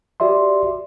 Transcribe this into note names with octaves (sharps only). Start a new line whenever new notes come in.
F#4 G4 D5 E5 C6